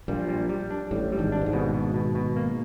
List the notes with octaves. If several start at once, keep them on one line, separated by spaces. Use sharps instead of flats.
A#1 A#2 G3
G3
G3
D4
A1 A2 G3
G3
G#1 G#2
D4
G2
G#1 G#2
B2
B2
B2
B2
A#3